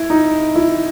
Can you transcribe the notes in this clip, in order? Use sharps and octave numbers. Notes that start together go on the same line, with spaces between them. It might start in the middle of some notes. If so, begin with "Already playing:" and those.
Already playing: E4
D#4
E4